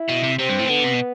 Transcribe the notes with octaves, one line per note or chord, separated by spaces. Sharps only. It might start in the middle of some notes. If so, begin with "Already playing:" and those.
Already playing: E4
B2
C3
C3 C4
G2
A2
E3
D3 B3
C3
B2